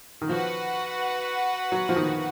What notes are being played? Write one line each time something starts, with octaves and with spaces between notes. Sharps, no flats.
D#3
F3 F#4 B4 F#5
F#3
F3
D#3